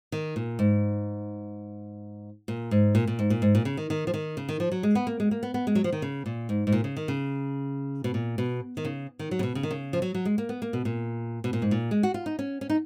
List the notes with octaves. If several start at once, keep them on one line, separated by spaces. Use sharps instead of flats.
D#3
A#2
G#2
A#2
G#2
A#2
A#2
G#2
A#2
G#2
A#2
C#3
D#3
D#3
F3
D#3
C#3
D#3
F3
F#3
G#3
B3
A#3
G#3
A#3
B3
B3
G#3
F#3
F3
D#3
C#3
A#2
G#2
G#2
A#2
C#3
D#3
C#3
B2
A#2
B2
D#3
C#3
D#3
F#3
C#3
B2
C#3
D#3
C#3
F3
F#3
F#3
G#3
A#3
B3
A#3
B2
A#2
B2
A#2
G#2
A#2
G#3
F#4
F4
D#4
C#4
C#4
D#4